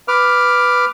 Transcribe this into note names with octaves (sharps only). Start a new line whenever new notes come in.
B4 D6 F6